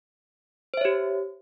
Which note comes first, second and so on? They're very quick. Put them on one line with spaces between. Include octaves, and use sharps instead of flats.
C5 E5 C#5 G4